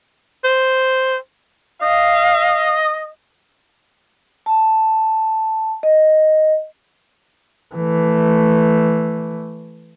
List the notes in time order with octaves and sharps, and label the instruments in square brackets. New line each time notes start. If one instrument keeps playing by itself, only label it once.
[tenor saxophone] C5
[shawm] D#5 [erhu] F5
[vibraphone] A5
D#5
[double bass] E3 A3